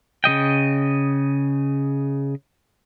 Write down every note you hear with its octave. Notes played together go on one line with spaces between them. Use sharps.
C#3 G3 D#5 G5